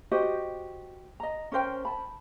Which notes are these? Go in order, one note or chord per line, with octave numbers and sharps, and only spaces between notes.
F#4 G4 C5 D#5
D#5 A#5
C#4 A#4 C5 G5
A5 B5